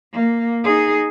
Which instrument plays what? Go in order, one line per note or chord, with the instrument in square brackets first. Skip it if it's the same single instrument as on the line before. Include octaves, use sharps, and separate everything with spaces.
[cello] A#3
D#4 G#4